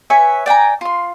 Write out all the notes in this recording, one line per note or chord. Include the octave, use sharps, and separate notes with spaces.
B4 C#5 E5 G#5
D5 G5 G#5 A#5
F4 C6